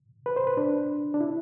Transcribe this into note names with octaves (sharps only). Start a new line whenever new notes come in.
B4
C5
B4
D4
D4
E4